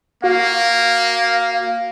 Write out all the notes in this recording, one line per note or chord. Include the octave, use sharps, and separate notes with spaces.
A#3 F#4 F5